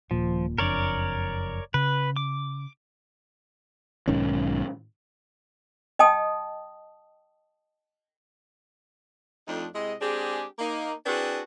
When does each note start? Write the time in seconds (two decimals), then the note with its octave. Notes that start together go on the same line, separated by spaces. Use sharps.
0.11 D#1 A#2 F3
0.58 F#1 F2 D4 A#4 C#5 D5
1.74 C#3 B4
2.16 D6
4.08 B1 G#2 D#3 C#4
5.99 D#5 G5 A5 D#6
9.47 F2 F3 A3 D4 D#4
9.74 C3 G#3 E4 D#5
10.01 G#3 C4 D4 G4 G#4
10.59 A#3 D#4
11.06 C4 D4 E4 F#4 G#4 B4